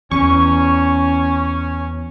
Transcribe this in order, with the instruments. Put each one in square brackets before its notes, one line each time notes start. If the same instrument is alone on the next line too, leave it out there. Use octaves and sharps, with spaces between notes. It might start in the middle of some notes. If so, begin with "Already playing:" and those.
[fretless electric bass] E2 [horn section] C#4 [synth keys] C#6